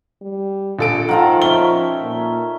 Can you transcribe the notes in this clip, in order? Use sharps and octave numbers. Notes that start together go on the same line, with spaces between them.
G3
A#1 A4 D7
D#3 F3 F4 A4 F#5
D#3 C#4 E5 G7
A#2